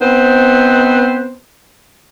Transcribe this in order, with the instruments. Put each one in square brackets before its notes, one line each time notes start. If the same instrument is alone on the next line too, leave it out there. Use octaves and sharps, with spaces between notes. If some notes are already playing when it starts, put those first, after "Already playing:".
[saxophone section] B3 C4 D#4 B4 C5